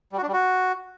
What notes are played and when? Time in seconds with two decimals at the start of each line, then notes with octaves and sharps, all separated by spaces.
0.12 G3
0.18 F#4
0.23 D4
0.28 G3
0.33 F#4